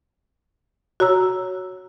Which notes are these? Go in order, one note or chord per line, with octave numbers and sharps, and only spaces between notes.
F#4 C#5 A#5 E6